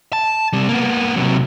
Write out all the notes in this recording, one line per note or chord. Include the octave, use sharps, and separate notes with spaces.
A5
C3 G3
A#3 B3
C3 F#3